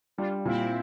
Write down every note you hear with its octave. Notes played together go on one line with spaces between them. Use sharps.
G3 D4 F4
A#2 C4 E4